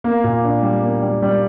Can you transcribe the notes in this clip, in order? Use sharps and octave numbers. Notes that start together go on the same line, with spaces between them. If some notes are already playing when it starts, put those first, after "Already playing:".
A#3
A#2
D4
G3
A#3
G3
G3